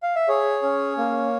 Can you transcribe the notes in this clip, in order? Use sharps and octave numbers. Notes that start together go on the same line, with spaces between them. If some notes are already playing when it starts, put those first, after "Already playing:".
F5
E5
G#4 C#5
C#4
A#3